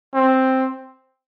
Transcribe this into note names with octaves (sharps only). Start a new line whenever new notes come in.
C4